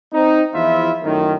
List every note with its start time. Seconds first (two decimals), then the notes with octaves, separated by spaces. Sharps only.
0.13 C4 D#4
0.54 E2 F3 E4 F4 E5
1.04 F#2 A2 D#3